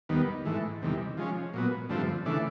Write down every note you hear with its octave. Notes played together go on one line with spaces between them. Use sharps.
D#2 D#3 G3 B3
G#2 E3 A3
E2 C3 D#3 G3
F3 G#3 C#4
A#2 F#3 B3
G2 D3 F3 A3 C4
C#3 E3 A3 D4